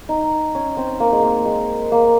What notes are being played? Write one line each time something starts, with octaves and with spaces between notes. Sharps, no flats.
D#4
C#4
C4
A#3
G#3
A#3
G#3
A#3